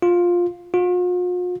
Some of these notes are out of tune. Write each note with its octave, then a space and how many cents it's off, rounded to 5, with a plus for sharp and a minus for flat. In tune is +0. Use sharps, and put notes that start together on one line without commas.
F4 +10
F4 +45